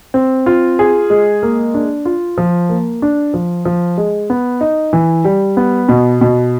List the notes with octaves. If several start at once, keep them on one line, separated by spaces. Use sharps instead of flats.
C4
F4
G#4
G#3
A#3
D4
F4
F3
A#3
D4
F3
F3
G#3
B3
D#4
E3
G3
B3
B2
B2